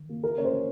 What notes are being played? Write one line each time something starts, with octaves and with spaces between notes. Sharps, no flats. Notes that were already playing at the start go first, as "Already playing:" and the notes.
Already playing: D#3
A#3
A#3 A#4
C#4 C#5
C5
C#4